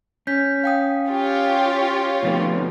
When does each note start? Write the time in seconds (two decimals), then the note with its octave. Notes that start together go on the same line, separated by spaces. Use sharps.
0.27 C#4 G6 B6
0.64 F5 G5 D#6
1.07 F4 G4 C#5
2.23 B2 F3 A3 C4 D#4 B4